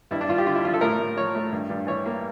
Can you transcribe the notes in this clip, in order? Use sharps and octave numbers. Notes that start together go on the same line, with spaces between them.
G2 E4
D4
G2 F4
G4
D3 F4
E4
F3 F4
A4
A2 A#4
A2
F3 C#5
A3
G2
G2
E3 C#5
A#3